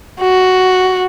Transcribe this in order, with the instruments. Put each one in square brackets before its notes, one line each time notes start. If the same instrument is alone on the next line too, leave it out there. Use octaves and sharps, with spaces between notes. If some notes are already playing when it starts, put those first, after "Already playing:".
[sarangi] F#4